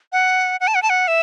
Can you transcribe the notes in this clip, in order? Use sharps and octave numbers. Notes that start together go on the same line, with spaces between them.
F#5
F#5
A5
F#5
A5
F#5
E5